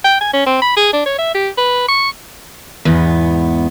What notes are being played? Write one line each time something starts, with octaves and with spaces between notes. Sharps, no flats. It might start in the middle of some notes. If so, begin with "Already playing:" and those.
G5
G#5
C#4
C4
B5
G#4
D4
C#5
E5
G4
B4
C#6
E2 G#2 B3